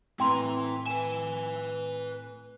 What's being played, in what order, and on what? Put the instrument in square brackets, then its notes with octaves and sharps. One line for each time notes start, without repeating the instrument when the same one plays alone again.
[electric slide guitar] A2 C4 A#5 [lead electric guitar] E4 B4 [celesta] G5 C6
[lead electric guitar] B4 G#5 [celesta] E7